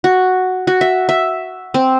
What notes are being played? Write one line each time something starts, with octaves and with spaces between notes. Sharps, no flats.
F#4
F#4
E5
E5
C4